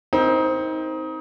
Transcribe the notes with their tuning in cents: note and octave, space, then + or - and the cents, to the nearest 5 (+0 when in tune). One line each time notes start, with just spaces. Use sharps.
C4 +0 D#4 +25 A#4 +0